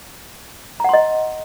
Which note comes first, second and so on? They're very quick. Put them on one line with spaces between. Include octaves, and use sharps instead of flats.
A#5 F#5 C6 D#5